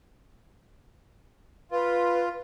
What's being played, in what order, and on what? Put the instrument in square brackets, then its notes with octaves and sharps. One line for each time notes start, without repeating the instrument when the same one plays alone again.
[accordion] F4 [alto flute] B4